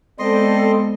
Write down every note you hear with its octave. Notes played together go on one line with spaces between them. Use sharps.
G#3 B3 C4 A4 D5 D#5 C6